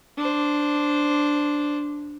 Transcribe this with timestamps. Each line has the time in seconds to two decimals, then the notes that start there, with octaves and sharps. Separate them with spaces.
0.18 D4 C5